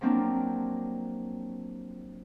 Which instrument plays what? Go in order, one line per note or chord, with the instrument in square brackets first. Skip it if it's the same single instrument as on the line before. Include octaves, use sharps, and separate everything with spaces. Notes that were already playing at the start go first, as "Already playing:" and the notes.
[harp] F3 F#3 A#3 C4 D4